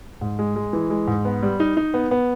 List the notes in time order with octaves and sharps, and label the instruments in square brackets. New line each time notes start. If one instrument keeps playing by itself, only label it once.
[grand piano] G#2
G#3
G#3
E3
G#3
G#2
B3
G3
D#4
D#4
B3
B3